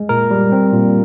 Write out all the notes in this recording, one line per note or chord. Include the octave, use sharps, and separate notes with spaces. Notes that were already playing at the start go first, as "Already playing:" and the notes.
Already playing: G#3
A#2 A#4
G3
C4
A#2